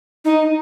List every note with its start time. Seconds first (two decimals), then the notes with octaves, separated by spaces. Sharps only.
0.25 D#4